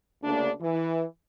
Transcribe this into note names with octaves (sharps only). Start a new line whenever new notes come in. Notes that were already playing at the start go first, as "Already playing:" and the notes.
D2 C#3 A#3 D4
E3